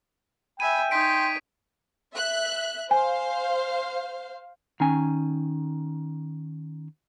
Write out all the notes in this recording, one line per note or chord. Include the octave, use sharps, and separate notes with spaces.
E5 G5 G#5 B5 D#7
D#4 C#5 C6 B6 D7
E5 F#6
C5 F5 G#5
D#3 C#4 G#5